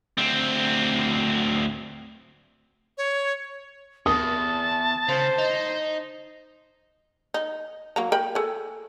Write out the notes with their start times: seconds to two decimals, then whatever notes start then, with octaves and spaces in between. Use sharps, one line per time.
0.18 D2 C4
2.98 C#5
4.06 E2 A5 D#6
5.08 C#3 C5
5.38 D#4
7.34 D#4
7.96 F#3 A#3 A#5
8.12 A#4 G5 B5
8.35 G#4 A4